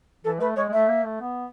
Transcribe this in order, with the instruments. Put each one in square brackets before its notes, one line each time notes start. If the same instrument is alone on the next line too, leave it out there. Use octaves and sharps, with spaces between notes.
[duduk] E3 [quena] A4
[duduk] A3 [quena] B4
[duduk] G#3 [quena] C#5
[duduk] G#3
[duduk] A3 [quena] E5
[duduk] A#3
A3
B3